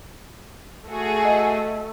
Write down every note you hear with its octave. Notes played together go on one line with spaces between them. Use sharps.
A3 F#4 G#4
D#5